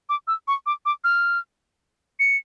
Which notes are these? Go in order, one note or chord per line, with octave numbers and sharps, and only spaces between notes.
D6
E6
C#6
D6
D6
F6
C#7